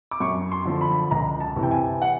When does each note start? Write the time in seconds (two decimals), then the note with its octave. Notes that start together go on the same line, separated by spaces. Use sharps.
0.11 D6
0.20 F#2 C#6
0.52 C6
0.65 D3 F3
0.81 B5
1.11 C#2 A#5
1.40 A5
1.56 C3 E3
1.63 G5
1.71 G#5
2.02 F#5